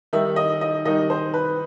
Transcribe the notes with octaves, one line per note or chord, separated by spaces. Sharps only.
D#3 G3 D#4 E5
D#5
D#5
D#3 G3 D#4 D#5
C5
B4